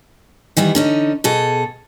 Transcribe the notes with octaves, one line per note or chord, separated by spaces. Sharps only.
D#3 E3 G3 B3
D3 C#4 D#4
B2 G#4 A4